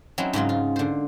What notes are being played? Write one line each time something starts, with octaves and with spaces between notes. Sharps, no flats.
F#3 C4 C#4 D#4 E4
G#2 C#3 F#3 F4
F4
D3 C5